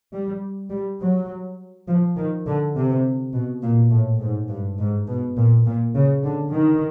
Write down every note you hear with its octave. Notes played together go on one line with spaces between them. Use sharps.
G3
G3
F#3
F3
D#3
D3
C3
B2
A#2
A2
G#2
G2
G#2
B2
A#2
A#2
C#3
D3
D#3